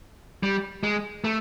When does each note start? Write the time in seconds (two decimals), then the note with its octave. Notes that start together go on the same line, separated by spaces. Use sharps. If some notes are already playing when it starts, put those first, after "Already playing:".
0.43 G3
0.83 G#3
1.24 A3